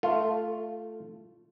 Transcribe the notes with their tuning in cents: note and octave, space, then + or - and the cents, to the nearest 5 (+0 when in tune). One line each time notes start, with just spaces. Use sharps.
A3 +0 F4 +0 A4 +35